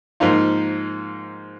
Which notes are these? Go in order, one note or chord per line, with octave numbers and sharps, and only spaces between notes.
G#2 F3 A#3 D#4 F4